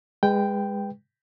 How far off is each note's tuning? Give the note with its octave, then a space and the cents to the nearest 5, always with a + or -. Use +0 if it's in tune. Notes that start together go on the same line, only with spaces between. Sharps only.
G#3 -25 B4 +0 G5 +0